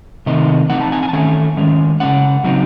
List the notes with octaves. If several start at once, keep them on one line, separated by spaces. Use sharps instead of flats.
C3 D#3 A3 C4 D#4 D#5
E3 C4 D#4 F#5
A5
G#5
G#5
A5
D#3 A3 C#4 G#5
D#3 G#3 C#4
C#3 G#3 C#4 F#5
C#3 F#3 C4 D#4